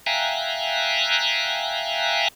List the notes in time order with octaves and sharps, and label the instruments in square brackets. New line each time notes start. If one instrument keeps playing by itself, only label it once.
[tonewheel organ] E5 F5 G5 G#5 A#5 F#6